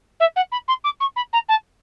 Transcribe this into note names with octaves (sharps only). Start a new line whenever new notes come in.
E5
F#5
B5
C6
D6
C#6
B5
A#5
A5